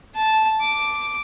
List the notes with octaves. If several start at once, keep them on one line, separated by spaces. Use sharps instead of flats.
A5
D6